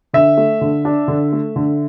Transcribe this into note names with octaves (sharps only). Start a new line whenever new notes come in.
D3 E5
A3
D3
D4
D3
A3
D3